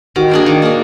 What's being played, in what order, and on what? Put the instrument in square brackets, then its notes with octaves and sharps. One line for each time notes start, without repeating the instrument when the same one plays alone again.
[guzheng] D#3 [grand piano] F#4
[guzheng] A#3 D4 G#4
D#3
A#3 D4 G#4